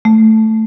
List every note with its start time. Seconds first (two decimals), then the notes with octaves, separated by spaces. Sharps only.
0.05 A3